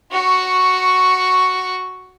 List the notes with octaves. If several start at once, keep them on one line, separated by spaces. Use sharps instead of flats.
F#4 C#6